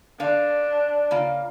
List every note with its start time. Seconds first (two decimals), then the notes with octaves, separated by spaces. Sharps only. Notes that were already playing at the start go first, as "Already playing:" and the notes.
0.20 D3 D4 F5
1.11 C#3 A#3 F4